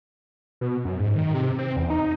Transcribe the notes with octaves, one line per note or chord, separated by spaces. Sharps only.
B2
F#2
G#2
D#3
C3
C4
E2
D#4